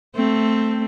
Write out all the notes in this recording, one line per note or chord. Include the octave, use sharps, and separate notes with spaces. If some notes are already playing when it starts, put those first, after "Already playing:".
A3 C4